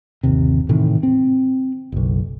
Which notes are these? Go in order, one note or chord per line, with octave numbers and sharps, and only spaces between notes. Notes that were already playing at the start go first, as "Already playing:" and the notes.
G1 D#2 C3
A2 C3 D#3 E3
C4
F#1 B1